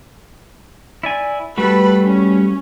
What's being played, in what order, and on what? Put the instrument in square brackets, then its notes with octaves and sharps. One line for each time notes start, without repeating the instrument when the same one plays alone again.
[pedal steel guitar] E4 D5 G#5
[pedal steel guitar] G3 A3 F#4 [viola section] A4 B4 B5
[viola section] C#4